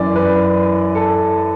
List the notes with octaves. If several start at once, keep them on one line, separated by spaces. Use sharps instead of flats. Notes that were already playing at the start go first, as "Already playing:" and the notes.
Already playing: F#2 E3 D5
B4
A4